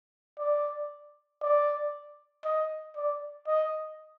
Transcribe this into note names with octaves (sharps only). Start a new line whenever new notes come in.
D5
D5
D#5
D5
D#5